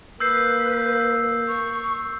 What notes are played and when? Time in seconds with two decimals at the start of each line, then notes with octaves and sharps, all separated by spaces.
0.20 A#3 B4 E6 G6 C7
1.48 C#6